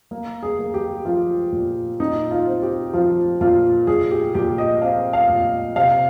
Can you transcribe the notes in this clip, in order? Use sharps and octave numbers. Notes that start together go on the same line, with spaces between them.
A#3
G#4
A#3
G4
F3 F4
A#2
A#2 D#4
F4
C4
G4
F3 F4
A#2 F4
A#2 G#4
G4
A#2 G4
D#5
C4 F5
F5
A#2
C3 F5